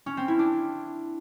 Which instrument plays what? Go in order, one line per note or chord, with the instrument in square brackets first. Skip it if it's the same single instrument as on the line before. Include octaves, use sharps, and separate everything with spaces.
[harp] C#4
C4
E4
D4